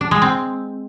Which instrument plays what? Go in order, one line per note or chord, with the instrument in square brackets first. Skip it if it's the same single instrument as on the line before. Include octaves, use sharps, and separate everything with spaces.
[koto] D4
G#3
C4